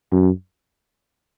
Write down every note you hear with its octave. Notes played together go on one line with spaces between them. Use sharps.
F#2